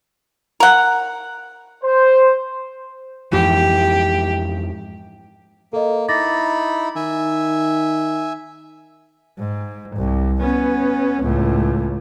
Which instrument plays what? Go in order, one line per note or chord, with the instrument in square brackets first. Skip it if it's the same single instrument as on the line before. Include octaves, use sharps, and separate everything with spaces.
[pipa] A#4 F#5
[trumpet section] C5
[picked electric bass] F2 G#2 E3 [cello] G4
[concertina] A#3 [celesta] A4 D#5
[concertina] D#4 E4 B5 [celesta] D6 A6 A#6
[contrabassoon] D#3 [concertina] E5 G#5
[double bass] G#2
C2
B3 C#4
C#2 A2